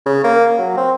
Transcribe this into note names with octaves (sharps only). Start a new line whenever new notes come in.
C#3
A#3
F#3
C4